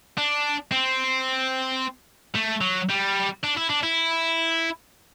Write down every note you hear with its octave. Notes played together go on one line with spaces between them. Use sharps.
D4
C4
A3
F#3
G3
D4
E4
D4
E4